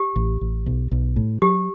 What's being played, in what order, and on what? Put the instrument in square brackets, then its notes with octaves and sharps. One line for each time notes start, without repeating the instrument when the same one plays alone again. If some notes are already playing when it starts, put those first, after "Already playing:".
Already playing: [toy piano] G4
[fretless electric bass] A1
A1
B1
B1
A2
[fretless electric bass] F#3 [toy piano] G4